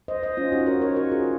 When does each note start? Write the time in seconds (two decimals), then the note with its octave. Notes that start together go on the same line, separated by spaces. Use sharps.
0.08 C5 D#5
0.23 C5 D#5
0.37 C#4 F4
0.52 D#4 F#4
0.67 A#4 C#5
0.81 A#4 C#5
0.96 F#4 A#4
1.12 F4 G#4